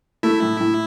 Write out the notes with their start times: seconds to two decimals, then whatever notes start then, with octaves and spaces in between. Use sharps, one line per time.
0.23 A3 E4
0.42 A2
0.60 A2